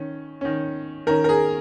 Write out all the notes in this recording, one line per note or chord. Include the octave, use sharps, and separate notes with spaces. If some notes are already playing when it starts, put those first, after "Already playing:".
Already playing: D#3 C#4
D#3 C#4
D#3 C#4 A#4
A#4
G#4